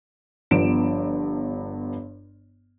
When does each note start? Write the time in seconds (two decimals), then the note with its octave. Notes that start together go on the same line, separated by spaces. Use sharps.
0.51 G1 G2 F3 B3 D7 E7